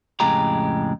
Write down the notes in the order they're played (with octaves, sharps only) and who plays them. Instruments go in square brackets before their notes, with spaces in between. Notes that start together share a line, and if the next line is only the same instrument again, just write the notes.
[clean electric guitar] F2 A2 C#3 G#3 G4 A#5